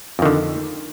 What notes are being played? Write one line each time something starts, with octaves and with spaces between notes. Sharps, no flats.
F2 D3 D#3